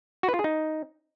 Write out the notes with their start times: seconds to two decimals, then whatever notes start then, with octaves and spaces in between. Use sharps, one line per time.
0.23 F#4
0.29 B4
0.34 F4
0.39 G#4
0.44 D#4